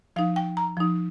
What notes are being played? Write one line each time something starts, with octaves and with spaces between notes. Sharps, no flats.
F3 D#4 F5
G5
A#5
F3 D#4